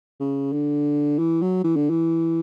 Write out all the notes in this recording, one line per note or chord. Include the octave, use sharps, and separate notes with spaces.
C#3
D3
E3
F#3
E3
D3
E3